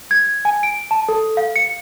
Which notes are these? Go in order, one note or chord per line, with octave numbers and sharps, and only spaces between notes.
G#6
G#5
D7
A5
A4
F5
C#7